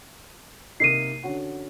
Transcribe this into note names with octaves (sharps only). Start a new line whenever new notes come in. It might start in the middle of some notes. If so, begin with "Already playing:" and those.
C3 A#3 D#4 C7 D#7
D3 C#4 F#4